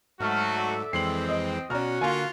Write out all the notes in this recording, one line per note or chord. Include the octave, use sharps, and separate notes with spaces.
G#2 F#3 G#3 A3 F#4 F6
A4 D5 E5
F2 E3 G#3 C4 C7 F#7
D#5
B2 C#4 F#4 D5 A#5 F6
D3 A#3 F4 G#5